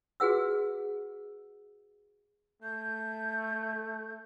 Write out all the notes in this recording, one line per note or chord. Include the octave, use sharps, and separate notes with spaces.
F#4 G#4 B4 F#5 E6
A3 G6